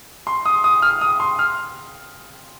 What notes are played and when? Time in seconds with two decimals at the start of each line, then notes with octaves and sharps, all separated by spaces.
0.27 C6
0.45 D#6
0.64 D#6
0.82 F6
1.01 D#6
1.20 C6
1.39 F6